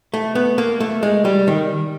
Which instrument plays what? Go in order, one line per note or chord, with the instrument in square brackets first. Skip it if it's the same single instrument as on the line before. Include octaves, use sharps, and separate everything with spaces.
[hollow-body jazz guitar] A3
B3
A#3
A3
G#3
G3
D#3